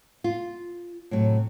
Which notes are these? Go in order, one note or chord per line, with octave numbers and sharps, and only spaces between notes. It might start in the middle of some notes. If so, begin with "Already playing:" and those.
F4
A2 C3 F#3